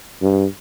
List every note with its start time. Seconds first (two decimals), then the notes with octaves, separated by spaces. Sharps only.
0.22 G2